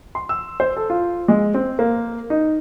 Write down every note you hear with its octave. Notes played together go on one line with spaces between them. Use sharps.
C6
E6
C5
A4
F4
G#3
C4
A#3
D#4